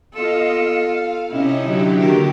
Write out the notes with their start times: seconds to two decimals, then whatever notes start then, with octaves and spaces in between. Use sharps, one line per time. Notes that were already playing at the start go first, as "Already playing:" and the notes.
0.14 B3 F4 A4 D#5 F5
0.57 F5
1.30 C3 C#4 D#4 E4 D#5
1.62 D3 F#3 G4
2.00 D#3 A#3 A#4